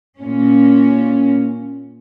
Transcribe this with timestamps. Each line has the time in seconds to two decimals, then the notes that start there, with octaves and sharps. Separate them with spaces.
0.17 A#2 C#4